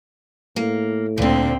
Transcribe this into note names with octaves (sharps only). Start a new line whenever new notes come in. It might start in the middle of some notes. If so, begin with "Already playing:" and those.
A2 A#3
D2 A#2 D3 C4